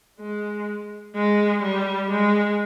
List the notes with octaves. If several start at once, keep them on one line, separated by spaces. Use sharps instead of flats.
G#3
G#3
G3
G#3